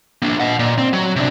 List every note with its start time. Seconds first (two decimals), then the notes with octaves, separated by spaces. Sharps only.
0.22 A#3 D4
0.40 D#5 F#5
0.59 A#2
0.78 C4
0.93 F#3
1.16 C3 D4